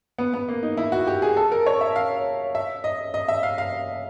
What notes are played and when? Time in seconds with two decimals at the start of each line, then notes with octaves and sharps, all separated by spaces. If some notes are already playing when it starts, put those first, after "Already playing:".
0.18 B3
0.34 B3
0.48 A#3
0.63 D#4
0.77 E4
0.92 F#4
1.07 G4
1.22 G#4
1.37 A4
1.52 A#4
1.66 C#5
1.81 E5
1.96 F5
2.55 E5
2.84 D#5
3.14 D#5
3.28 E5
3.43 F5
3.58 F5